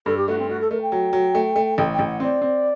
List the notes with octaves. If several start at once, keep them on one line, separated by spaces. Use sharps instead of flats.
G2 A4
G4
A3 F#4
C4
A3 F#4
A4
A3 A#4
G5
F#3
F#3
A3
A3
A1 G5
G5
A1
F#5
C4 D5
C4